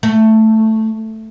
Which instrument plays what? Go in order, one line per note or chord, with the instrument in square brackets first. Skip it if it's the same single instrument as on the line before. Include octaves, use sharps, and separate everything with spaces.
[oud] A3